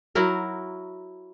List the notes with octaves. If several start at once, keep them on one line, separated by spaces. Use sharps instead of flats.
F#3 E4 F#4 A#4